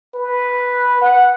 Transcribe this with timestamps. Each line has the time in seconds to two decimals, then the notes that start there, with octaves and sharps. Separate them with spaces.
0.15 B4
1.02 F#5